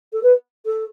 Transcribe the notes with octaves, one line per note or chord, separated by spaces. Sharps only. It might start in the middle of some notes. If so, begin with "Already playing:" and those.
A4
B4
A4